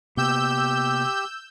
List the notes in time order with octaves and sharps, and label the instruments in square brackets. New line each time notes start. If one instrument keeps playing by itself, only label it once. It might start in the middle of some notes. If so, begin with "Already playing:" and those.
[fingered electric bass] C3 A#3 B3 [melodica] G4 [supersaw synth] E6 G6